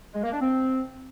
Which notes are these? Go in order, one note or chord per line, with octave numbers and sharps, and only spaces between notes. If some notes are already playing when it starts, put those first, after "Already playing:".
G#3
A#3
D4
C4